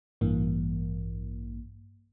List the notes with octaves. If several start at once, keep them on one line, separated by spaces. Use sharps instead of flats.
A1 G2 E3 A#3